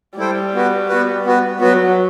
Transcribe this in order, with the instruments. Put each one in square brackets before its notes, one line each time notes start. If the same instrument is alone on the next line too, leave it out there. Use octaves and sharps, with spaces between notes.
[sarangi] G3 [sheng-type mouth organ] E4 A4 C5 G5
[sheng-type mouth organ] B3 F#4 B4
B3 F#4 B4
B3 F#4 B4
[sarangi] F#3 [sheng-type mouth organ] B3 F#4 B4